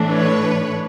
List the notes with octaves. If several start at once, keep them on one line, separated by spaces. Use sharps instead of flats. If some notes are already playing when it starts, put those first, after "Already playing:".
Already playing: A2 E3 A3 D4
B4 C#5